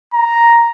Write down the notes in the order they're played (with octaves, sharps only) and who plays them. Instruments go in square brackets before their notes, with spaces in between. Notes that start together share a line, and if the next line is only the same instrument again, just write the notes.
[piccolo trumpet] A#5